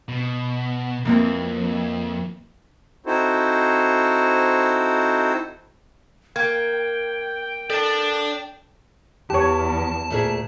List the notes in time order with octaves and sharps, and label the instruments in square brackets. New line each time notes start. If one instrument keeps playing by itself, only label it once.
[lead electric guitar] B2
[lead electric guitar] F2 [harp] E3 A#3 C4
[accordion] C4 D#4 E4 F#4 A4 C5
[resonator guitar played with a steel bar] A#3 [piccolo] G5 [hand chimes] G#6
[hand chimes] A4 [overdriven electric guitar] D5 A5
[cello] E2 [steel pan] G4 C#5 [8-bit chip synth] A5
[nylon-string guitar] D2 A#2 G#4